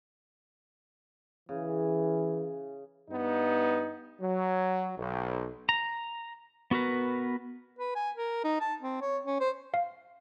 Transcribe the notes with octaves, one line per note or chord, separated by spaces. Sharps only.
C#3 E3
G2 B3 D#4
F#3
B1
A#5
B3 F#4 A#4 B4
B4
G#5
A#4
D#4
A5
C4
C#5
C#4
C5
F5